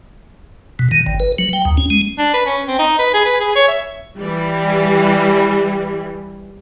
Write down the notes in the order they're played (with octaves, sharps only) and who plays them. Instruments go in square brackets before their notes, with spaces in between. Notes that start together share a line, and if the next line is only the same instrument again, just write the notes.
[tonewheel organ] B2
D#3
G1
B4
F#3
G5
D#2
C#4
G#3
[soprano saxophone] D4
B4
C#4
C4
D#4
B4
G#4
B4
G#4
C#5
E5
[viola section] E3 G3